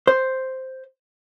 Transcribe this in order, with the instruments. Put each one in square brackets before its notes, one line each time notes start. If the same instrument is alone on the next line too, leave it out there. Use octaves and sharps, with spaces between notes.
[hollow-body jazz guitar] C5